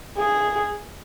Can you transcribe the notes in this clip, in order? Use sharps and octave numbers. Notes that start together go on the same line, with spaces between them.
G#4